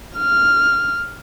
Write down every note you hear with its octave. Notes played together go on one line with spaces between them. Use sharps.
F6